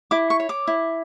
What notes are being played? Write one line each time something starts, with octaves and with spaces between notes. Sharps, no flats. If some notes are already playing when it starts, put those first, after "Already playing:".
E4 D6
C#6
C#5
D6
E4